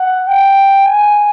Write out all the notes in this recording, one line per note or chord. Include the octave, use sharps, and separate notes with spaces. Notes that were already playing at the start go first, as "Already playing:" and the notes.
Already playing: F#5
G5
G#5